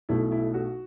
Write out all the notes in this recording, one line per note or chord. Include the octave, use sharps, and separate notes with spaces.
B1 B2 A3 E4
E4
F#4